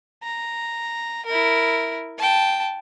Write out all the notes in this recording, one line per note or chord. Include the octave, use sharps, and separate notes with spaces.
A#5
E4 A#4
G5 A5